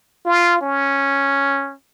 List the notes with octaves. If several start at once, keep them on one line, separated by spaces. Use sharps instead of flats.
F4
C#4